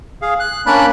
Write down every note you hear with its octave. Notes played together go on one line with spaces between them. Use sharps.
G#4 F5
F#6
A#3 C#4 D4 D5 B5 F#6